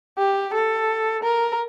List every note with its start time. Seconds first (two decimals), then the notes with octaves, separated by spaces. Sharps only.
0.18 G4
0.54 A4
1.23 A#4